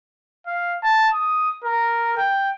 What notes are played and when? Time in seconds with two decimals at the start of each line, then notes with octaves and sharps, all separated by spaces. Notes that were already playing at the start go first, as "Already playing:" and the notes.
0.47 F5
0.83 A5
1.13 D#6
1.64 A#4
2.17 G5